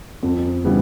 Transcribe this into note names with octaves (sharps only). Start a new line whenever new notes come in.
F2
C#3 E3 G3 B3